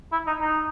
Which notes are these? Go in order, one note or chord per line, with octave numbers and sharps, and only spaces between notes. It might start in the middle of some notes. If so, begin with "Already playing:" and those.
E4
D#4
D#4